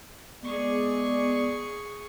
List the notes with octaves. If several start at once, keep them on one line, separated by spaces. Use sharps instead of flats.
G#3 B3 G#4 D5 C#6